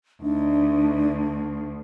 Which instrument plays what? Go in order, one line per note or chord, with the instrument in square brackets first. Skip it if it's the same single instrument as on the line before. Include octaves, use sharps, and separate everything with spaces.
[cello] D2 [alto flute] D4 [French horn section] D#4